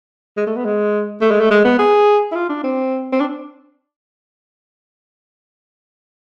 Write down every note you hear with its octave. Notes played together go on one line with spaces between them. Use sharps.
G#3
A3
B3
G#3
A3
G#3
A3
G#3
B3
G#4
E4
F4
D4
C4
C4
D4